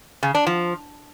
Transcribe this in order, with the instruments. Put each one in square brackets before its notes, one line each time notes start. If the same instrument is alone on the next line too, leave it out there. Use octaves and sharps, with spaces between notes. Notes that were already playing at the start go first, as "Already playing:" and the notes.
[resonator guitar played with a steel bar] C#3
D4
F3